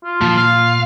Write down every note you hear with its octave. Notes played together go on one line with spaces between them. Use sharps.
F4
A#2 F3
F5